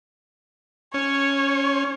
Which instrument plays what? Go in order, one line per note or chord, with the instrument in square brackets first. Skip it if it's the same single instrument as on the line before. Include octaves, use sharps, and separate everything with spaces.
[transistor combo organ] C#4 [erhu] C#5